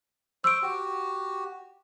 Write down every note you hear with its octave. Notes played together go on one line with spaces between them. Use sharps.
C5 C#6 E6 D7
F#4 G4